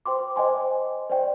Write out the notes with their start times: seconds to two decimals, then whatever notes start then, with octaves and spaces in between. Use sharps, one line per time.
0.06 C5 G5 C6 D6
0.36 C5 D#5 G5 G#5 C6
1.10 C5 D5 G5